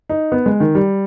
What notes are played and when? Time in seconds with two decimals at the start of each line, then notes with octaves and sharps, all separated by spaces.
0.09 D#4
0.32 B3
0.46 G#3
0.60 D#3
0.75 G3